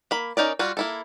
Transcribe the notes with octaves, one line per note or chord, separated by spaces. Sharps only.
A#3 B5
C#4 D#4 A#4 D5
G3 F4 F#4
A#3 E4 A4